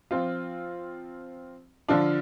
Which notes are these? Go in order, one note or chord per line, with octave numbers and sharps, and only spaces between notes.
F3 C4 F4
D3 F3 D4 F4